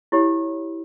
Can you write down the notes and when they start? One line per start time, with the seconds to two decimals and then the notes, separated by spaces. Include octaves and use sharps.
0.12 E4 G4 C#5 B5